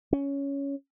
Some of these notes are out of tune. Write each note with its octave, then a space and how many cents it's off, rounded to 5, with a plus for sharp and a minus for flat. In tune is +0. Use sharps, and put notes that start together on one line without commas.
C#4 +10